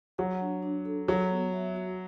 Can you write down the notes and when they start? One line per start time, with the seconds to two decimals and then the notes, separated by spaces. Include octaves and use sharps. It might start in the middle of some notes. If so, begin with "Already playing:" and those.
0.18 F#3 F#5
0.41 D4
0.62 D4
0.85 A4
1.08 F#3 A4
1.31 B3
1.53 E5
1.75 F#4